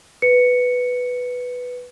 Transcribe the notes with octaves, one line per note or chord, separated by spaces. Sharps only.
B4 C#7